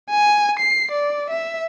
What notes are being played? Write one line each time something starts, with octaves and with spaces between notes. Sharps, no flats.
G#5
C7
D5
E5